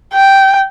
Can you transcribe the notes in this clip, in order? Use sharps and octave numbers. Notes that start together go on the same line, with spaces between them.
G5